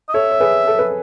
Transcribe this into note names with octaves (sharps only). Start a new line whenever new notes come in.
D#5
A4 C#5 E5
C#5
G#4 B4
A4
B4